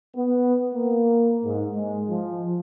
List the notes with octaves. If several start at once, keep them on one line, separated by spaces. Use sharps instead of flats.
B3
A#3
G#2
G#3
F3